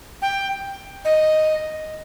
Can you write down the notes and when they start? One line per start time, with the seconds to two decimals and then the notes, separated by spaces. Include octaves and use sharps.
0.22 G5
1.05 D#5